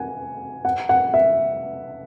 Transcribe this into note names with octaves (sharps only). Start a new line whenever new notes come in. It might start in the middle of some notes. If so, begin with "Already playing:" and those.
Already playing: F#5 G#5
F#5
F#5
E5